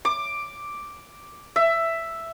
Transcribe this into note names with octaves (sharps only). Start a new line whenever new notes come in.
D6
E5